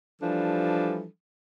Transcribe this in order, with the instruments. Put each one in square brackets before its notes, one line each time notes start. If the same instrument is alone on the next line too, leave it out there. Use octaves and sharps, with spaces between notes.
[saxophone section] E3 F3 G3 D4 A4